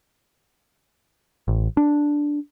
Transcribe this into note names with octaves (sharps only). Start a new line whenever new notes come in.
A1
D4